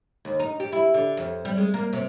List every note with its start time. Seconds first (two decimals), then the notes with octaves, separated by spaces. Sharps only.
0.25 D#2
0.40 D#4
0.60 G4
0.72 E4
0.94 D3
1.17 F2
1.45 G3
1.57 G#3
1.74 A#3
1.93 C3